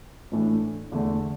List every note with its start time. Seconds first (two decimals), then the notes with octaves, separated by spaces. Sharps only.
0.32 A2 E3 A3 D4 A4
0.92 E2 D3 A3